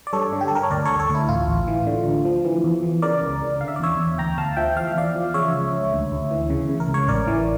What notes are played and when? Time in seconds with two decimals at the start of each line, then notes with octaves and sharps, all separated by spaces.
0.07 D5
0.13 G2 A4 C#5
0.32 D3
0.41 G4
0.48 A4
0.52 G2 A#4
0.63 C#5
0.71 D2 A#4 D5
0.85 D2 A4 C#5
0.99 A4 C#5
1.10 D2
1.15 E4
1.29 A1 F4
1.48 A1
1.68 E3
1.87 D3
2.06 D2
2.25 F3
2.45 E3
2.64 E2
2.83 E3
3.02 C#3 A#4 D5
3.22 C#2
3.41 C#3
3.60 D3 F5
3.68 E5
3.76 D5
3.80 E2 C#5 E5
3.99 E2
4.18 D2 G5 A#5
4.38 D2 F5 A5
4.56 F3 E5 G5
4.76 E2 F5
4.88 E5
4.96 E2 D5 F5
5.15 F3
5.34 C#3 C#5 E5
5.53 C#2
5.73 C#2
5.93 D2
6.12 D2
6.31 E3
6.50 C#3
6.69 C#3
6.80 A#4
6.88 C#2
6.94 C#5
7.08 A1 A#4 D5
7.27 E3